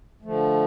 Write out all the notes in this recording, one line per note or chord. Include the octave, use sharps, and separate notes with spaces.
D3 F3 A3